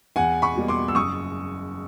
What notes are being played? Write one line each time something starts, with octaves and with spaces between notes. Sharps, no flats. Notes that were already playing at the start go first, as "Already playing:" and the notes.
E2 F#5 G#5
B5 C#6
B2 G3 A#3
C6 D6
E6
F#1 C#6 D#6